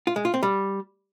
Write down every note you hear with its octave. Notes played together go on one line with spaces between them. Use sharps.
F4
G#3
F4
C4
G3